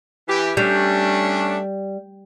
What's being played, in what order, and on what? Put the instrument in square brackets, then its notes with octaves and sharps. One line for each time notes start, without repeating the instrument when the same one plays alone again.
[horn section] E3 G4
[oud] G3 [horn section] A3 C#4 D4